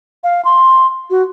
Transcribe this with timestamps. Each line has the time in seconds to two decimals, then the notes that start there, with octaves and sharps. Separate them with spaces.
0.24 F5
0.45 C6
1.10 F#4